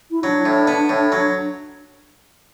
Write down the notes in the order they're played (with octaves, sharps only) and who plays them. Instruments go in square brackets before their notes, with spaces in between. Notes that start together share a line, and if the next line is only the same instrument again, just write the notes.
[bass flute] E4
[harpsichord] F#3 [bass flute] D4
[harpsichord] A2
B3
A2
F#3